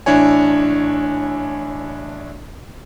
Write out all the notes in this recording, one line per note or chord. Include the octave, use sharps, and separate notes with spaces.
A1 D4 E4 C#5 G#5